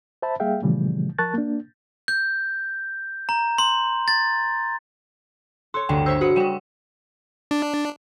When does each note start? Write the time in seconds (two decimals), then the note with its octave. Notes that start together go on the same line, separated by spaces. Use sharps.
0.22 C5 E5 A5 B5
0.40 G3 A#3 G#4 E5 F5 G5
0.62 A#2 C#3 E3 F3 G3 A3
1.18 F3 A#4 A5 C#6 F#6 A6
1.34 A#3 D4
2.08 G6
3.29 A#5
3.58 C6
4.08 A6
5.74 A4 C#5 C6
5.89 G1 D2 D3 G5
6.06 C5 C#5 E5 E6
6.21 F#4 G#4 B4 F#5
6.36 G3 F#4 F#5 G5
7.51 D4